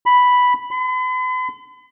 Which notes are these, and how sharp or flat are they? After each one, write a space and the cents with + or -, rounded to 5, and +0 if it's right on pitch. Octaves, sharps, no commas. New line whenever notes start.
B5 +0
B5 +45